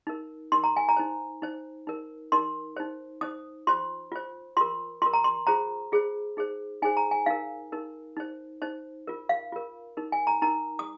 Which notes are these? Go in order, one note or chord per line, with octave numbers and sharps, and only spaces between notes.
D#4 A#4
D#4 A#4 C6
A#5
G#5
A#5
D#4 C5
D#4 C5
D#4 A#4
D#4 A#4 C6
D#4 C5
D#4 C5 D#6
F4 C5 C6
F4 C5
F4 A#4 C6
F4 A#4 C6
A#5
C6
F4 G#4 C5 A#5
F4 G#4 C5
D#4 G#4 C5
D#4 G#4 C5 G#5
A#5
G#5
D#4 A#4 F5
D#4 A#4
D#4 C5
D#4 C5
F4 A#4
F5
F4 A#4
D#4 A#4
G#5
A#5
D#4 A#4 A#5
D#6